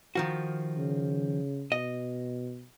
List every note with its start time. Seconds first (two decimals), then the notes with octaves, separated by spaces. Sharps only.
0.15 D#3 F3 F#4
0.77 C#3
1.72 B2 D#5